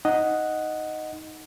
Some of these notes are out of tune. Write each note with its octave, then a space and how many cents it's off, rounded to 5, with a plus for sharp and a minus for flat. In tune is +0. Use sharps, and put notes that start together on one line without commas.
D#4 +0 D#5 +0 F#5 +0